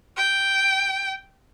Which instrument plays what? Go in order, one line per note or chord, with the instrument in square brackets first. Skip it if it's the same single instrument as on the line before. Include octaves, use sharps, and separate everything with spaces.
[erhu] G5